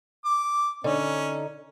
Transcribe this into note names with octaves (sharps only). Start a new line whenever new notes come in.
D6
D3 C#4 D#4